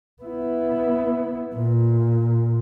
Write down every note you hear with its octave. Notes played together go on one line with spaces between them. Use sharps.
B3 E4
A#2